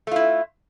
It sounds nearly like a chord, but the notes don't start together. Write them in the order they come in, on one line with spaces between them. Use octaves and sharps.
A3 F4 E4